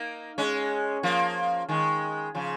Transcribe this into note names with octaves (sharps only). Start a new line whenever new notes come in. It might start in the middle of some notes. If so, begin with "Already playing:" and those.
Already playing: A#3 D#4
G#3 C#4
F3 A#3
D#3 G#3
C#3 F3